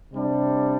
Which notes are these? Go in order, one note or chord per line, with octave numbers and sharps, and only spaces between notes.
C3 G3 D4